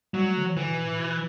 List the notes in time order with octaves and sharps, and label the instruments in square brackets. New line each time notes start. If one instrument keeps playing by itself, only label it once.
[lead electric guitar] F#3 [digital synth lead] G3
[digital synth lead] A3
D3
E3
[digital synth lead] D3 [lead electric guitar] E3
[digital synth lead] B2
A2
B2